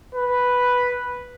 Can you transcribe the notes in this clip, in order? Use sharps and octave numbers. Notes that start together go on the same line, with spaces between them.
B4